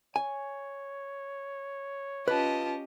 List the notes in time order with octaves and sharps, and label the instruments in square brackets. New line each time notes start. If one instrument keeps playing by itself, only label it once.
[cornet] C#5 [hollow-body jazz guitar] G#5
[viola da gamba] C#4 G4 D#5 [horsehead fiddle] F4 A5 [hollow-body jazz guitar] B4